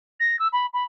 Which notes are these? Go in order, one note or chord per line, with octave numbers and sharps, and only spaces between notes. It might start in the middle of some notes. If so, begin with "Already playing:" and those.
A#6
E6
B5
B5